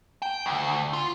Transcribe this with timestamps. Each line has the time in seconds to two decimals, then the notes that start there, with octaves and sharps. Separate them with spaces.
0.22 G5
0.46 D2
0.93 F4